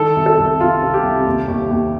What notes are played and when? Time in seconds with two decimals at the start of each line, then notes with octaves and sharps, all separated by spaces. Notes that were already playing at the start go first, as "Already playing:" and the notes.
Already playing: D#3 A4
0.16 C2
0.26 A4
0.38 C2
0.60 C2 F4
0.83 C3
0.94 G4
1.04 C2
1.27 D#2
1.48 D#2
1.71 D#2